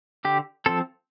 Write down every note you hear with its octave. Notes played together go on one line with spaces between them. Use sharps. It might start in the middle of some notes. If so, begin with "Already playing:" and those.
D3 G4
F3 C4 A4